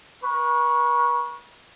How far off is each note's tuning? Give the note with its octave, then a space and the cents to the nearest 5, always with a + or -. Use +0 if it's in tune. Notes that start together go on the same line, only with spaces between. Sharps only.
B4 -45 C#6 +0